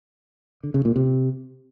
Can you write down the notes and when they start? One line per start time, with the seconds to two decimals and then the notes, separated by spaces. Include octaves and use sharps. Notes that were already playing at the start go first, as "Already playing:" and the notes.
0.63 D3
0.74 C#3
0.85 A#2
0.96 C3